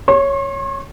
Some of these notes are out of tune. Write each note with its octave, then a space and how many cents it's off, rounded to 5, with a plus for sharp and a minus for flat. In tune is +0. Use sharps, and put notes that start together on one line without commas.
C#5 +0 C6 +45